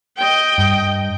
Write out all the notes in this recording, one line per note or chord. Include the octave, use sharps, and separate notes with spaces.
D#5 G5
G2